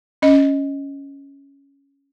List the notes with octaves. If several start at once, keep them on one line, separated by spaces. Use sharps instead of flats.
C#4 D#5